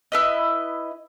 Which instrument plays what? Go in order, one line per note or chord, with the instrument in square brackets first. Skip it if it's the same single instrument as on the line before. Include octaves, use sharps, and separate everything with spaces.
[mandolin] E4 B4 D#5